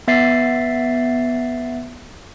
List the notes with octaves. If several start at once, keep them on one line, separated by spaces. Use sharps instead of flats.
B3 E5 A6 C7